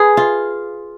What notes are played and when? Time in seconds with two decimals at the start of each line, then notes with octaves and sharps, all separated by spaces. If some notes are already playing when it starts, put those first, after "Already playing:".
Already playing: G#4 B4
0.17 F4